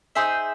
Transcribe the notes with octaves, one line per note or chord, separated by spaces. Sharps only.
D#4 G#4 C5 E5